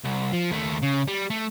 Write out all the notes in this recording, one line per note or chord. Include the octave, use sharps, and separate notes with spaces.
C2
F3
D#2 A3
C#3
G3
A3